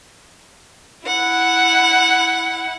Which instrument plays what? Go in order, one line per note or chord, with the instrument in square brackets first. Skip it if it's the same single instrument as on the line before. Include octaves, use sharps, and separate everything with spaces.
[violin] E4 F#5